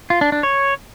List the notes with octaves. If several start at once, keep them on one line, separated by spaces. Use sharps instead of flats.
F4
D4
D4
C#5